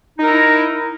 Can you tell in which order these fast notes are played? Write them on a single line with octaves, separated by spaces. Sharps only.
D#4 A#4 E4